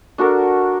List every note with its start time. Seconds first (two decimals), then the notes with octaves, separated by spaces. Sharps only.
0.18 D4 F#4 A4 A#4